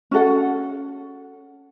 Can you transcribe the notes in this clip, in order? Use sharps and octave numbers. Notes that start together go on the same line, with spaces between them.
C#4 F#4 A4 F#5